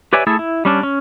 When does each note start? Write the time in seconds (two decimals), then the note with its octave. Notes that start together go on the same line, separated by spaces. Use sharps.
0.13 G4 B4 C#5 D5 E5 G#5
0.27 A3 E4 G#4 A4
0.39 E4
0.65 G3 C#4 D4
0.83 C#4